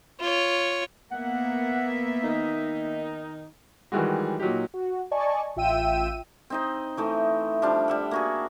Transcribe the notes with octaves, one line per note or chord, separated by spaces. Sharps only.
F4 C#5
A#3 B3 E5 F#5
D#3 D#4
D#3 E3 G3 G#3 F#4
A#2 F#3 D#4 G4
F#4
D5 D#5 G#5 A5 C#6
A1 F4 E5 G5 E6 D#7
C4 D#4 D#5
E3 A3 D#4
F3 G3 D4 D6
G3 E5 F#5
A#3 F#4 G#4